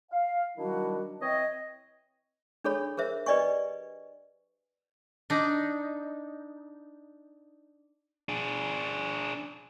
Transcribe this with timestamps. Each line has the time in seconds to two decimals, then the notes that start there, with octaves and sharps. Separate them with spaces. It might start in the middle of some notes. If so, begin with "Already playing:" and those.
0.11 F5
0.58 D#3 F#3 G3 D4 E4 F#4
1.21 E3 C4 C#5 D#5
2.64 D4 G#4 A4 C#5 B5
2.97 G#4 A#4 C5 E5
3.26 G4 B4 D5 D#5 G#5 C#6
5.30 D4 D#4
8.29 D4 G#4